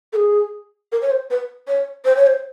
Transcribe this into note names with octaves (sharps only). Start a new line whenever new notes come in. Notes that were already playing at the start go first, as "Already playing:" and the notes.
A4
G#4
A#4
C#5
C5
B4
C#5
C5
C#5
C5